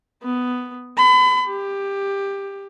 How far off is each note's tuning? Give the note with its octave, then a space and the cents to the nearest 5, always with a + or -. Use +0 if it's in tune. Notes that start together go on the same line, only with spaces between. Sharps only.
B3 +10
B5 +35
G4 +15